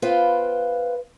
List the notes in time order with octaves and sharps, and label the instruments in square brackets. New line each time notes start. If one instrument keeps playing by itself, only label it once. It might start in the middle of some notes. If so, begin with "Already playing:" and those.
[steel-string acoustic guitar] B3 F4 B4 C5 F5 G5